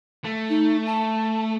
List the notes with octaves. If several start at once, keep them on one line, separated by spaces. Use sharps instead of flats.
A3
D#4
A5